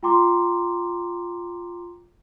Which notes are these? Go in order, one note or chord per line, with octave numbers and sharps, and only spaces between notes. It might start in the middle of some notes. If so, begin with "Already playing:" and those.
F4 G5 A#5 C6 D6